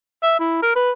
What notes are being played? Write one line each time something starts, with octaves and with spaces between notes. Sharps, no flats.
E5
E4
A#4
B4